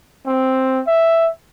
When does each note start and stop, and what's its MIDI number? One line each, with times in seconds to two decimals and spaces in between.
0.26 0.80 60
0.87 1.29 76